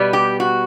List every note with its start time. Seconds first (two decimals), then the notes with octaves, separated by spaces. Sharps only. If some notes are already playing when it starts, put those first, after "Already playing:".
Already playing: B2 G3 B3
0.13 G4
0.40 F#4